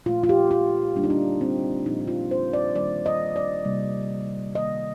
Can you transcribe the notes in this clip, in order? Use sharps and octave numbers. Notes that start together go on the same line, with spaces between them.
A#2 A3 F4
F4
G4
F4
D3 G3 A#3 D4
D#4
D4
C4
A#2 F3 A#3 D#4
D#4
F4
C5
D5
D#3 G3 A#3 D5
D#5
D5
C3 G3 A#3
D#3 G3 A#3 D#5